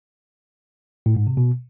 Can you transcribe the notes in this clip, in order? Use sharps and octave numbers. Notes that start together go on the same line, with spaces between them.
A2
G#2
C3
B2